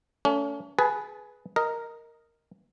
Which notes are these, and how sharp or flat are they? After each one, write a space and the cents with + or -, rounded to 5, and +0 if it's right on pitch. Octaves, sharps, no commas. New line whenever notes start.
A3 +25 C#4 +35
G#4 +15 B4 +0 A5 -25
A#4 -5 D#5 +5